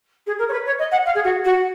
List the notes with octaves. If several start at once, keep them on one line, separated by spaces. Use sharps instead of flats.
G#4
A#4
C#5
B4
C#5
D#5
F#5
F5
G#4
F#4
F#4